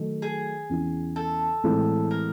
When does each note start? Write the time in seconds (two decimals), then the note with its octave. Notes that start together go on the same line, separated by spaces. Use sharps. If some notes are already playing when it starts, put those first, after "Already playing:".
Already playing: D#3 F#3 A3
0.22 G#4
0.69 E2 C#3 E3
1.16 A4
1.64 A2 E3 G#3 C4 E4
2.11 A#4